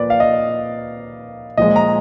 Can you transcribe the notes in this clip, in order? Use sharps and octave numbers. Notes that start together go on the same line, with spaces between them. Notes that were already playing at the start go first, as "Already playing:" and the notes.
Already playing: A#2 F3 A#3 B4 D5
F5
D#5
A#2 F3 G#3 D#5
A#5